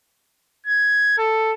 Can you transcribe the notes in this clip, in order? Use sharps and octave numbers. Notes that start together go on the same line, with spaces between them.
G#6
A4